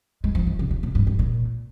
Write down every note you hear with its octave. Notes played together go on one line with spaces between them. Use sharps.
G#3
F3
D#3
C#3
C3
A#2
G2
G2
A#2